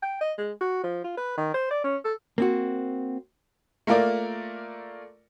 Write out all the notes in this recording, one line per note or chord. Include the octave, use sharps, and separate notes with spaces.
G5
D#5
G#3
F#4
F3
F4
B4
D#3
C5
D5
C#4
A4
A#3 C4 F#4
A3 A#3 F4 A#4 D5